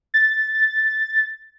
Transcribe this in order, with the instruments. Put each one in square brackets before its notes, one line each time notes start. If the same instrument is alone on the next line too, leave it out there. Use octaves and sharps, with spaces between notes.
[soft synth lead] A6